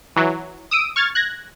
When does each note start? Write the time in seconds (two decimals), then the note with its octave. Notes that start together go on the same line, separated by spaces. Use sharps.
0.16 E3 F#3
0.71 D#6 E6 D7 D#7
0.96 C#6 F6 G#6 A6
1.15 F#6 G#6 A#6